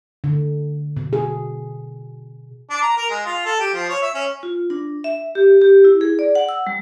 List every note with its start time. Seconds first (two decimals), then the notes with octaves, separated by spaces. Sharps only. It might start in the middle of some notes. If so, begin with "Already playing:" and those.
0.24 D3
0.97 B2
1.13 G#4
2.70 D4
2.82 A#5
2.97 A#4
3.10 G#3
3.26 F4
3.46 A4
3.60 G4
3.74 F3
3.89 C#5
4.02 E5
4.15 C#4
4.43 F4
4.70 D4
5.04 E5
5.35 G4
5.61 G4
5.85 E4
6.01 G#4
6.19 D5
6.35 F#5
6.49 E6
6.67 G3